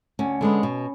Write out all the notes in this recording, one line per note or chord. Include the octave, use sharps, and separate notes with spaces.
D2 C#4
D3 G#3 B3
B2